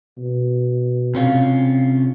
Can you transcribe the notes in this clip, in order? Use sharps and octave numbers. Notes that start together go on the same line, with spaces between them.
B2
C3 C#4 F4